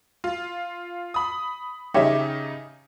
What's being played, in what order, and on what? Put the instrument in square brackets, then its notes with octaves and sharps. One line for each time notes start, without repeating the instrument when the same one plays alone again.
[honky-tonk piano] F4
B5 D#6
[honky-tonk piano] C#3 D#4 [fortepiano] G4 C#5 E5